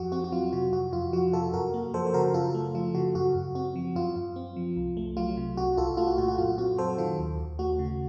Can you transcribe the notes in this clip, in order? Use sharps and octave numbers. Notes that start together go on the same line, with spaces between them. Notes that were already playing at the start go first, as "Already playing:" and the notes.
Already playing: F2 F3 F#4
C4 F#4
F#4
F#3 F4
C3 F#4
F2 F#4
F2 F4
F3 F#4
C3 F4 A4
F#2 F#4 A#4
A#3
F3 A4 C5
C5
C#3 F#4 A#4
F#2 F4 A4
A3
F3 F4
C#3 F#4
F#2 F#4
F#2
C4 F#4
F3
F#2 F4
F#2
C4
F3
C2
A3
F#3 F4
C3
C2 F#4
C2 F4 A4
A3 F4
F#4
A#2 F#4
F#4
F#2 F4
C4 F#4
F#3 A4 C5
D#3 F4
D#2
D#2
A3 F#4
C#3